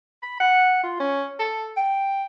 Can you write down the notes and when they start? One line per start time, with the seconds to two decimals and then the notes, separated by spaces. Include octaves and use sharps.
0.23 B5
0.40 F#5
0.83 F4
1.00 C#4
1.39 A4
1.77 G5